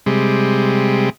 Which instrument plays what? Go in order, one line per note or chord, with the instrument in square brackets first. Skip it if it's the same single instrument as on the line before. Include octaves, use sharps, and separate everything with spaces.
[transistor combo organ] C3 G3 G#3